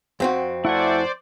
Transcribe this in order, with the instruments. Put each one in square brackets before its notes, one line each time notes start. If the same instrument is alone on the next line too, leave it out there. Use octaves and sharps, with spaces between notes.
[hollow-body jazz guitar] F2 C4 F#4
[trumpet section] A3 F#5 [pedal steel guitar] E4 G#5 [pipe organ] C5 D5